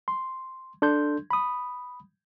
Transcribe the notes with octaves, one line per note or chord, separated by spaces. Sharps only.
C6
D4 A4 C6 G6
B5 D#6